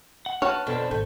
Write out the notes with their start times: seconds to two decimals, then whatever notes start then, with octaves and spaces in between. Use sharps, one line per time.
0.26 F#5
0.42 D4 F#4 B4 C#5 A5 F6
0.67 F2 B2 D3 G5 A5
0.91 G#1 A3 G6